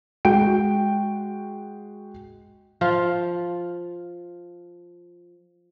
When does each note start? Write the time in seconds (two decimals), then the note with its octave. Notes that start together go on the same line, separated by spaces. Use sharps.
0.25 G#3 F#4 G5 D7
2.81 F3 F4